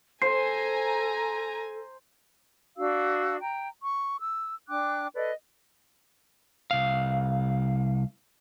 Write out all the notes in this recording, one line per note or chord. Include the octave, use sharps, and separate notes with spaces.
A4 C5 G#5 A#5 C7
D4 F#4 F5 E6
G5 A#5
C#6
E6
D4 G5 D6 F#6
A4 B4 D5 D#5
C2 F5